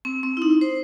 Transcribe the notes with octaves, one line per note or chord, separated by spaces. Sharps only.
C4
C4
E4
D#4
C5